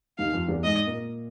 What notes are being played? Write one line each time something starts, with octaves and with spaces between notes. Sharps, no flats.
D#2 D#3 F5
F2 F3
E2 E3
G#2 G#3 D#5
A#2 A#3